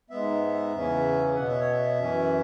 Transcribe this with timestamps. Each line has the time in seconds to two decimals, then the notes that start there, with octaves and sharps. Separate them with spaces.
0.10 G#2 G#3 B3 E5
0.72 E2 C#3 E3 C#4
1.35 B2 B3 F#5
1.48 E5
1.60 C#5
1.71 E5
1.98 F#2 E3 C#4